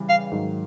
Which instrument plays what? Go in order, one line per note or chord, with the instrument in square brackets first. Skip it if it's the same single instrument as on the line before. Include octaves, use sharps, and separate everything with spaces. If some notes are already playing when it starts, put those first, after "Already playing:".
Already playing: [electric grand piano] C#3 E3 G3
[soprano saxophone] F5
[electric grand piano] G#2 D#3 F#3